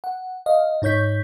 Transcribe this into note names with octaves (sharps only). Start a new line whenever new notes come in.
F#5
D#5 F5
G#2 D#4 C#5 G6 B6